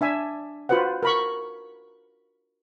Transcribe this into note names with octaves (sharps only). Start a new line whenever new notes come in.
D4 E5 G#5
F4 F#4 B4 C5 F#5
A#4 B5 C#6